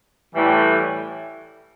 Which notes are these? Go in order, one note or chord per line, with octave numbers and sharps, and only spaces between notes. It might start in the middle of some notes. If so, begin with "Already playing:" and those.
A2 E3 G3